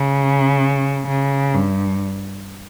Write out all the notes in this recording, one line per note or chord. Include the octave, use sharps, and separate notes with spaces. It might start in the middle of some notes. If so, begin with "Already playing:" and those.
Already playing: C#3
C#3
G2